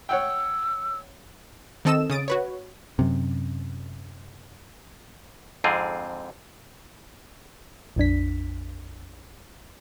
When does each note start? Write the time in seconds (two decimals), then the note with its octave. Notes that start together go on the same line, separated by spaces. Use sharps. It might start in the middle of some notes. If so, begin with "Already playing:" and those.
0.09 C#5 F#5 G5 E6
1.85 D#3 C4 A4 D#5 E6 E7
2.10 C#3 D#6 A6 D7
2.28 F#4 B4 C#5
2.99 F#2 C3
5.64 F2 G#2 D3 C4 F4 G#4
7.96 A#1 F2 D4 B6